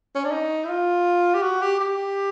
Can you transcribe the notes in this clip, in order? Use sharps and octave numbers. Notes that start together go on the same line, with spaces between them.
C#4
D4
D#4
E4
F4
G4
F#4
G4
G4